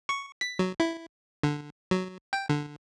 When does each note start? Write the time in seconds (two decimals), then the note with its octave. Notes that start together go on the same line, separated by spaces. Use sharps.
0.09 C#6
0.41 B6
0.59 F#3
0.80 E4
1.43 D3
1.91 F#3
2.33 G5
2.49 D3